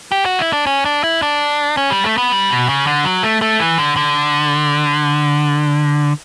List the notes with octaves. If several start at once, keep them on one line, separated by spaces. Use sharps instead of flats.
G4
F#4
E4
D4
C#4
D4
E4
D4
C#4
G3
A3
B3
G3
B2
C#3
D3
F#3
A3
A3
E3
D3
D3